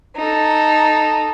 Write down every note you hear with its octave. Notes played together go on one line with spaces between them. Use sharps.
D#4 A4